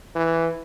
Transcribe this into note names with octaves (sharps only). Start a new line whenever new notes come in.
E3